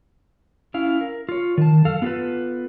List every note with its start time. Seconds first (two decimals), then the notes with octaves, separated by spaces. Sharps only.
0.74 C#4 E4 F5
1.01 A#4
1.29 F4 C#5
1.58 D#3 A5
1.85 F#2 A4 F5
2.02 B3 F4 G4 A4 B4